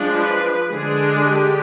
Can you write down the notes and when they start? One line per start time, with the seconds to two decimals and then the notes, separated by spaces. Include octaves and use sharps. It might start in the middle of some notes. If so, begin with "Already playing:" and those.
Already playing: F3 G#3 D4
0.16 B4
0.69 D3 G#3 D4 G#4
1.23 G4